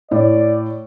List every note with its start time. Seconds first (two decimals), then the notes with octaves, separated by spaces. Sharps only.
0.11 A2 D5